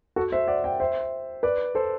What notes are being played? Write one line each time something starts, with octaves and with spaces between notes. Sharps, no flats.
F#4 A4
C5 E5
D5 F#5
E5 G5
C5 E5
B4 D5
A4 C5